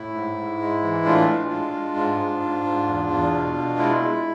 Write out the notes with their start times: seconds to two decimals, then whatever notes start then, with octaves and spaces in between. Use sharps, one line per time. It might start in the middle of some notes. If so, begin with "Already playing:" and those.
Already playing: A2 E4
0.14 G#2
0.37 G#2
0.60 G#3
0.83 E3
1.05 A2 D4 F4
1.28 G#3
1.51 G#3
1.74 G#3
1.96 G#2
2.19 G#2
2.42 G#2
2.65 G#2
2.87 E2
3.10 E2
3.33 B2
3.56 B2
3.78 G#3 E4
4.01 G#3